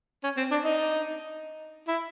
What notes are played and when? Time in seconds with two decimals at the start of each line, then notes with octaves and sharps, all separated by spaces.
0.24 C#4
0.37 C4
0.51 D4
0.65 D#4
1.88 E4